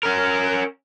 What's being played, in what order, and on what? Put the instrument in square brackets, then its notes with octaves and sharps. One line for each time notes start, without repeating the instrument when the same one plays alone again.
[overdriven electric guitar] C#4 A#4